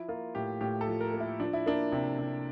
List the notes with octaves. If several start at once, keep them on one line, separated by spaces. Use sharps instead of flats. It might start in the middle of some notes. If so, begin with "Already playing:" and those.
Already playing: F3 E4
A#3 F4
A2 G4
A2 G4
A4
F3
A#4
A#3
E4
F3 D4
E4
A#3 D4
C3
C3